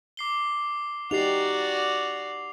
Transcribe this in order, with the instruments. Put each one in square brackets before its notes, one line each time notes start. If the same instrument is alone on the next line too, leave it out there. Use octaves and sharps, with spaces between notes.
[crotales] D6 C7 G7
[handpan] D#4 G4 [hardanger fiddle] F#4 D5 [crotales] C7 F7